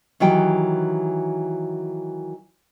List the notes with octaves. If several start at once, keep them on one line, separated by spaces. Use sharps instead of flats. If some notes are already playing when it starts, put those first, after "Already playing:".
D#3 E3 F#3 G4 G5